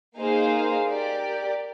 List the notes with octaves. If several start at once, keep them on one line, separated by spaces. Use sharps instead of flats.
A#3 D#4 G#4 C5 F5
G4 A#4 D5